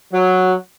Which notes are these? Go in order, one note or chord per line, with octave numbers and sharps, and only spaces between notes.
F#3